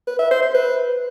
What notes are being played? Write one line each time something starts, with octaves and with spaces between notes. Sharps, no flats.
B4
E5
C5
C5
B4